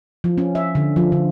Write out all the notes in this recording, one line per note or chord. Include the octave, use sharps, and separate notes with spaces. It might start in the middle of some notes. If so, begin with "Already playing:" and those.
F3
C#4
E5
D3
F3
D3